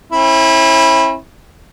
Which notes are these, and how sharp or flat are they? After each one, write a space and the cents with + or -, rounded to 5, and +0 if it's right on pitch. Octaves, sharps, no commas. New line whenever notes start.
C4 +45 E4 -15